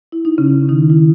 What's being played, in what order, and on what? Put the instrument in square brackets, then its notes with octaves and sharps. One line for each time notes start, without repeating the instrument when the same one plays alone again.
[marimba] E4
D#4
C#3 C#4
D#3 D#4
E4